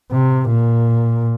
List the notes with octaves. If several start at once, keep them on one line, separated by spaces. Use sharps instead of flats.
C3
A#2